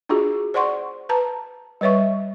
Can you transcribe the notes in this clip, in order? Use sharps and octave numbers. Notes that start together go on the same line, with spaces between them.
D4 F4 F#4 G#4
C5 D5 F#5 C6 C#6
B4 A5 A#5
G3 B4 C#5 E5 C#6